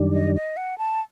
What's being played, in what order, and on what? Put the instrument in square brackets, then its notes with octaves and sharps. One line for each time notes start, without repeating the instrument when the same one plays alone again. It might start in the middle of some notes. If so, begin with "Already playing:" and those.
Already playing: [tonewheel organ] F#2 D#3 G3 D4
[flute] D#5
D#5
F#5
A5